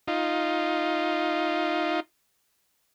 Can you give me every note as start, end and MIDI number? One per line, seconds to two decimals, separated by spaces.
0.08 2.00 63
0.08 2.00 65